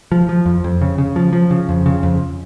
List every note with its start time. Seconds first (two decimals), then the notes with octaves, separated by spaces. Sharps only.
0.12 F3
0.29 F3
0.46 F2
0.64 F2
0.81 C#3
0.98 C#3
1.16 F3
1.33 F3
1.51 C#3
1.69 F2
1.86 C#3
2.03 F2